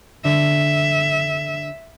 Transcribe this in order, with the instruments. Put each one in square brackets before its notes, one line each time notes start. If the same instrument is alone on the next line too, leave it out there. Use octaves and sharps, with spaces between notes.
[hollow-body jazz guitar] D3 [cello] E5